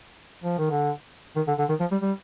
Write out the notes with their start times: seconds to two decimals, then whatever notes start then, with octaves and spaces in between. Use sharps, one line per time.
0.44 F3
0.58 D#3
0.70 D3
1.36 D#3
1.47 D3
1.59 D3
1.69 D#3
1.80 F3
1.92 G3
2.02 G3